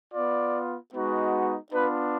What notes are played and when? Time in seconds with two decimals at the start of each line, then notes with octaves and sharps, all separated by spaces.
0.13 B3 F4 D5
0.93 G#3 B3 D#4 F#4
1.73 B3 D4 F4 B4